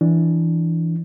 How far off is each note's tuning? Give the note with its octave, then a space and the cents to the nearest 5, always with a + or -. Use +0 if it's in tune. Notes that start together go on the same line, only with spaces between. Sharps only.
E3 +0 D4 +0